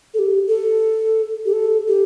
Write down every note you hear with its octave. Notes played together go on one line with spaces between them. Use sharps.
A4
G4
A4
G4
A4
G4